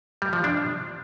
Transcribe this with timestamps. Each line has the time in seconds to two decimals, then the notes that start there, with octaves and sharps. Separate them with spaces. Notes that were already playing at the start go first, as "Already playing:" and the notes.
0.22 G3
0.33 F3
0.44 D4